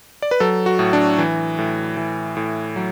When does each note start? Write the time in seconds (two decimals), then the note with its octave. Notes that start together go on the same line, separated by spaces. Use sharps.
0.22 D5
0.31 B4
0.40 F#3 A4
0.66 F#4
0.79 A2
0.93 D4
1.18 E3
1.58 A2
1.97 E3
2.37 A2
2.76 F#3